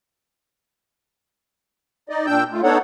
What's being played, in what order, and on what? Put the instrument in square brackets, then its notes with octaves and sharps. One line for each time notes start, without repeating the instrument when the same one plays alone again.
[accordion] D#4 D5 D#5
A#2 D4 G5 E6 G6
A3 F4
B3 D4 D#4 A4 C#5 F#5